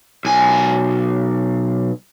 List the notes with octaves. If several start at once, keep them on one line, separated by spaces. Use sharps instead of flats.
B1 G#5